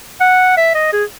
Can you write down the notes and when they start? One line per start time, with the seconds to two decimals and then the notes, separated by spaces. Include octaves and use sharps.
0.21 F#5
0.57 E5
0.75 D#5
0.93 G#4